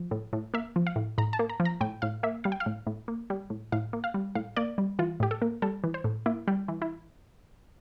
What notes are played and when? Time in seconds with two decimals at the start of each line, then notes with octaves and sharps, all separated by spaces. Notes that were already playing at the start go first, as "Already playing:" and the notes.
Already playing: F3
0.11 A2
0.33 A2
0.54 A#3 E5
0.76 F3
0.87 F5
0.96 A2
1.18 A2 A#5
1.33 A5
1.39 A#3
1.49 A#5
1.60 F3
1.65 A#5
1.81 A2 G5
2.02 A2 F5
2.23 A#3 E5
2.44 G3 F5
2.52 G5
2.60 F5
2.66 A2
2.87 A2
3.08 A#3
3.30 G3
3.50 A2
3.72 A2 F5
3.93 A#3
4.04 F5
4.14 G3
4.35 A2 F5
4.56 A#3 D5
4.78 G3
4.99 E3 F4
5.20 A2 G4
5.31 A4
5.42 A#3
5.62 G3 A4
5.84 E3
5.94 C5
6.04 A2
6.26 A#3 E4
6.48 G3
6.68 E3
6.82 E4